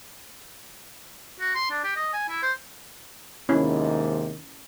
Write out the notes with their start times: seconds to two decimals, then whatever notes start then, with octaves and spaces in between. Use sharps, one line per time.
1.40 F#4
1.55 C6
1.70 D4
1.84 G4
1.96 D#5
2.14 G#5
2.29 E4
2.43 C5
3.49 D#2 G#2 C3 C#4 E4